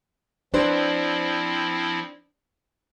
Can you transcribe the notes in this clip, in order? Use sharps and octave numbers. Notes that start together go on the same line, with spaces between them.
F3 C4 D4 E4 B4 C5